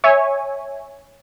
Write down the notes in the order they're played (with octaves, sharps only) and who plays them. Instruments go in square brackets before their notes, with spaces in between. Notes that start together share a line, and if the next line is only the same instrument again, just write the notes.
[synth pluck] C#5 E5 G#5